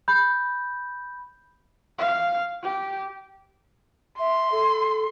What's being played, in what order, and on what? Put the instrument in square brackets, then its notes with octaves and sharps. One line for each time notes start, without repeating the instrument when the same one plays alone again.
[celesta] B5 G6
[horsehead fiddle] F5
G4
[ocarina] E5 [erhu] C6
[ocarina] A4